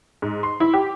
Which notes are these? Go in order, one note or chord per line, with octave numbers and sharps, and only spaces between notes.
G#2
C6
E4
G4